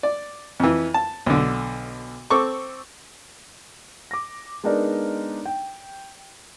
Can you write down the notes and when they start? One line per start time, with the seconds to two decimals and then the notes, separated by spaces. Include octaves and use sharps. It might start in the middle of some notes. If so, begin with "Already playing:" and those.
0.03 D5
0.60 F2 E3
0.94 A5
1.26 B1 D3
2.30 C4 A4 C#6 D6
4.11 D6 A#6
4.64 G#3 B3 D4 D#4 A#4 D5
5.46 G5